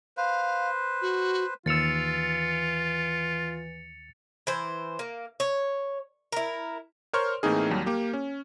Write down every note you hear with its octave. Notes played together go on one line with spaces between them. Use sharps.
B4 C5 F5
F#4
D#2 E3 F4 E6 A6 C#7 F7
E3 C5
A#3
C#5
E4 A#4
A#4 C5 C#5 C6 C#6 F6
A2 E3 A#3 C4 D#4 G#4
D#2 F#3 G3
A#3 G4
C#4